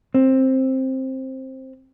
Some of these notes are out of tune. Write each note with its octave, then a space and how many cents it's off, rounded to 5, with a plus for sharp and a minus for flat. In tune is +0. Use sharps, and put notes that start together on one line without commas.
C4 +10